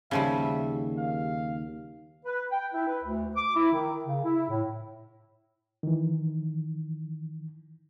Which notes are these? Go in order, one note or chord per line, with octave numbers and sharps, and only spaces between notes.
D#2 C#3 F3 G3 E5
F5
B4
G5
E4
B4
D2
D6
E4
D#3
C#3
E4
A2
D#3 E3